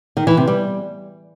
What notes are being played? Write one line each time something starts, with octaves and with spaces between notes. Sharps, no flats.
D#3
E3
C3
G3